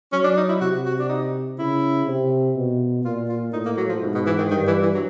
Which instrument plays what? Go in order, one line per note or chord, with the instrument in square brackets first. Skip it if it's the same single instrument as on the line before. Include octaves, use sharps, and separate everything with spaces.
[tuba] F#3 [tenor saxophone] C#4
[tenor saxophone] D4
D#4
E4
[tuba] C3 [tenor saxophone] F#4
[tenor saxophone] F#4
D4
D#4
[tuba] C#3 [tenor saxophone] E4
[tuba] C3
B2
[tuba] A#2 [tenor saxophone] F4
[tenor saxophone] F4
[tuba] A2 [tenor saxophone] D#4
[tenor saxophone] A#3
F#3
F3
[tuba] G#2 [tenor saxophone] B2
[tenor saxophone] B2
E3
D#3
[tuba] G2 [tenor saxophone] D#3
[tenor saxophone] E3
E3
F#3